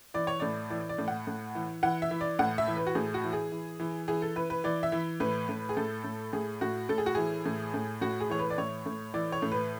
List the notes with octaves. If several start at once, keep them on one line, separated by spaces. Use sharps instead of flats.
E3 D5
C#5
A2 D5
E3 D5
D5
A2
F#5
A2
E3
E3 F#5
E5
E3
D5
A2 F#5
E5
E3
B4
F#4
A2 G#4
F#4
E3
G#4
E3
E3
E3 G#4
A4
E3 B4
B4
E3 D5
E5
E3
A2 B4
A2
G#4
A2 A4
A2
A2 G#4
A2 F#4
A2 A4
G#4
F#4
E3 G#4
A2
A2
A2 F#4
G#4
E3 C#5
B4
D5
A2 C#5
A2
E3 D5
C#5
A2
B4